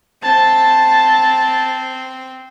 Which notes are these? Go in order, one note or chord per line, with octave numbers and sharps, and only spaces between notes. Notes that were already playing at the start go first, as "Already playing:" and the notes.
C4 A5